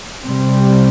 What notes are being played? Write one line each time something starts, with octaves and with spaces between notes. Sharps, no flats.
C3 G3 C4